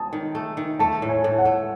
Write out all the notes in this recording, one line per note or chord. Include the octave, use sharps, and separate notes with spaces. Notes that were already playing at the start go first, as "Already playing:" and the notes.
Already playing: F#3 G#5 A5 D#6
D#3
A3
D#3
A3 A5
A2
G#5
A2
F#5
A3